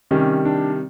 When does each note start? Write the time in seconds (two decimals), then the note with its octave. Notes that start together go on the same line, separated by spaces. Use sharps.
0.11 C3 D#3 G3 C#4
0.45 D4